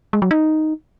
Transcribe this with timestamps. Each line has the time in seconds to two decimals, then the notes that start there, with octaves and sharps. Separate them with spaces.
0.13 G#3
0.22 F#3
0.31 D#4